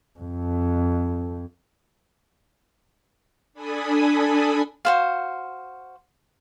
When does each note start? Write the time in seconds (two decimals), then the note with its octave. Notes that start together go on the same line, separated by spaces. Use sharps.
0.19 F2
3.54 D4 A4 G#5 B5 D#6
4.85 F#4 C5 F5